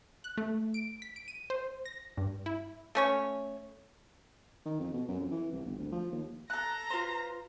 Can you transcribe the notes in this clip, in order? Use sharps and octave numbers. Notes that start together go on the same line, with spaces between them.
F#6
A3
D7
B6
D7
D#7
C5
A#6
G2
E4
A3 C#4 C#5
D#3
F2
B2
F#2
F2
E3
C2
G1
D2
F3
D#2
A4 A#5 F#6
F4 B4 C5